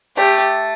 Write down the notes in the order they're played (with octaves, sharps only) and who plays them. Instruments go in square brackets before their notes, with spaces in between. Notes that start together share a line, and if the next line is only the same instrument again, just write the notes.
[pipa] A3 [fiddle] G4